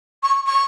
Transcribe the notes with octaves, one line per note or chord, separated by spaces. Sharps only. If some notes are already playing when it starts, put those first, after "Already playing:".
C#6
C#6